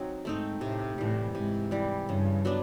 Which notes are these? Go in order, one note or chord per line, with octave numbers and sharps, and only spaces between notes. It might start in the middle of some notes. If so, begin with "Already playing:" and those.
Already playing: F#3 C4 D#4
G#2 A3 C4 D#4
A2 C3
A2 E3 G3
G#2 C3
E3 G3
G2 C#3
F#3 B3 D4